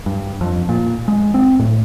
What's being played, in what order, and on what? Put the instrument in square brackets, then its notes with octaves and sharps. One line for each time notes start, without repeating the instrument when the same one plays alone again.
[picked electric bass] G2
F2
A#2
G#3
C4
A2